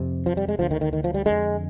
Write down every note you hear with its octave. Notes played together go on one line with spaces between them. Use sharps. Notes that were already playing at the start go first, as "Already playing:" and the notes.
Already playing: F2 C3
F3
G3
G#3
D2 D3 F3
D#3
D#3
D#3
F3
G3
F2 D3 G#3